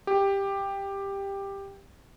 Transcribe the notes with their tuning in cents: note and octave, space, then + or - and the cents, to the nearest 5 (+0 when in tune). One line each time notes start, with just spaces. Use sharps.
G4 +10